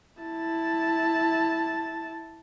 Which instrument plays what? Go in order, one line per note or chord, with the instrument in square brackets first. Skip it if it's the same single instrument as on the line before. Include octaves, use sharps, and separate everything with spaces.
[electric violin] E4 A5